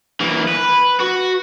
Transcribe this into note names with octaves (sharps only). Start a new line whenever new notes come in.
E3 A#3
B4
F#4